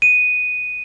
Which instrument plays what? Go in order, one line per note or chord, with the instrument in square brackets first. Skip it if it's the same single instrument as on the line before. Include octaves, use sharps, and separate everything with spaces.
[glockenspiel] D#7